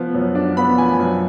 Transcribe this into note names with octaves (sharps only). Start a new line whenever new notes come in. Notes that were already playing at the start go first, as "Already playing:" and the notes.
Already playing: F3 B3
F#2
D4
B3 B5
F3 G#5
F#2